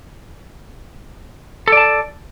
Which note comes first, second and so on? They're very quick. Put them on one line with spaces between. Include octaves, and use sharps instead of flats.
A4 D5 A5